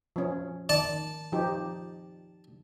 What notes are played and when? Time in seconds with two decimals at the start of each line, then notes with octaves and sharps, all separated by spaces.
0.16 F3 C#4
0.69 D#3 D5 A5
1.32 F3 D#4 G4